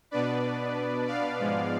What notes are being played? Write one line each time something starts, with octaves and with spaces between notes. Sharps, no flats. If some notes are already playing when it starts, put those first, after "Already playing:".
B2 B3 D4 B4 D5
D5 F5
G#2 F3 G#3 B3